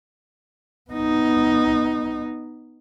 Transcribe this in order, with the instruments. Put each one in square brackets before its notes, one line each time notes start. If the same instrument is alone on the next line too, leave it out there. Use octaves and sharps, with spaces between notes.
[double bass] B3 D#4